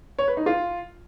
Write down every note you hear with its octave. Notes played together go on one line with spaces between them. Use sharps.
C#5
B4
D#4
F4